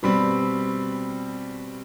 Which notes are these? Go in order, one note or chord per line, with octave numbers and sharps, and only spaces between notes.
B2 G3 C4 B5